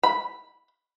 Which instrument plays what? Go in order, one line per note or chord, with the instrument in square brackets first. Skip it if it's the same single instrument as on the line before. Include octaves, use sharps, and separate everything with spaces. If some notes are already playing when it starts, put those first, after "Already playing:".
[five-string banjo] B5